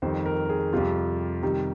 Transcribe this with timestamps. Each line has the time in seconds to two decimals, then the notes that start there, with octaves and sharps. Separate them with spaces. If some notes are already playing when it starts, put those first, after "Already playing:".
0.02 F2 D#3 G3 C5
0.26 A#4
0.50 G#4
0.73 F2 C3 G3 F4
1.42 C3 D#3 G3 D#4